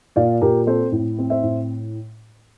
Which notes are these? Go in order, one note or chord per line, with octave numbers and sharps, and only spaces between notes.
A#2 D5 F5
A#2 G4 A#4
C4 A4 C5
A2
C4
C5 E5
A2